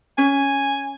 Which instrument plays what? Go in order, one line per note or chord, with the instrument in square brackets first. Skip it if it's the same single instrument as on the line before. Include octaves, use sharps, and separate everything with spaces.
[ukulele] C#4 [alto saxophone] G#5